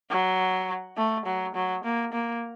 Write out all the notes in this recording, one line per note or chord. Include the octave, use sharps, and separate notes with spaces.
F#3
A3
F#3
F#3
A#3
A#3